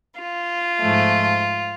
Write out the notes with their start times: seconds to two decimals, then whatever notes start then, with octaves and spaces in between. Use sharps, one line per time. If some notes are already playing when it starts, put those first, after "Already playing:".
0.20 F4
0.79 G#2 F3 A3